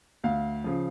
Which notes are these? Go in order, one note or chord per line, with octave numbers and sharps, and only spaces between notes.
D2 F5
C#3 F3